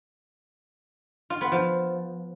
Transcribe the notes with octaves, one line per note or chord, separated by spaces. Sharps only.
F4
B3
F3